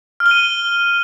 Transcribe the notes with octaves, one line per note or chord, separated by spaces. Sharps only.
F6
G7
D#7